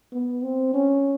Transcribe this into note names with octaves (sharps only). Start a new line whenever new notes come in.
B3
C4
C#4